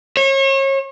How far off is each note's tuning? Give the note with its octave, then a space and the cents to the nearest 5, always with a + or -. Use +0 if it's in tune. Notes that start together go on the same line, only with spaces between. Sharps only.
C#5 -35